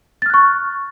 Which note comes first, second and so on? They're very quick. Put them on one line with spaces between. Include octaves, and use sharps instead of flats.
A6 F6 F#6 C#6